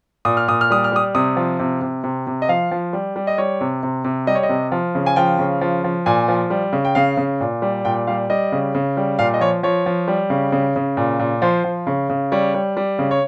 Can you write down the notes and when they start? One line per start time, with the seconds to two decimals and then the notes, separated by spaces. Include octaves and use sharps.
0.25 A#2 D#6
0.37 F6
0.48 A#2 D#6
0.61 F6
0.70 G3 D#6
0.84 F6
0.92 G3 D#6
1.15 C3 D#6
1.36 F3
1.59 C3
1.81 C3
2.04 C3
2.27 C3
2.42 D#5
2.49 F3 F5
2.71 F3
2.93 G3
3.16 G3
3.27 D#5
3.38 G3 C#5
3.61 C3
3.83 C3
4.05 C3
4.27 G3 D#5
4.35 C#5
4.43 D#5
4.49 C3
4.72 F3
4.95 C#3
5.06 G#5
5.16 F3 G5
5.39 C#3
5.61 F3
5.84 F3
6.06 A#2 G#5
6.28 F3
6.50 G3
6.73 C#3
6.85 G5
6.95 C#3 F5
7.17 C#3
7.40 A#2
7.62 G3
7.85 A#2 G5
8.07 G3 F5
8.30 G3 D#5
8.52 C#3
8.75 C#3
8.97 G3
9.19 A#2 F5
9.34 D#5
9.41 F3 C#5
9.63 F3 C#5
9.86 F3
10.08 G3
10.30 C#3
10.52 C#3
10.76 C#3
10.97 A#2
11.19 A#2
11.42 F3 C5
11.64 F3
11.87 C#3
12.10 C#3
12.32 G3 C#5
12.54 G3
12.77 G3
12.99 C#3
13.11 C#5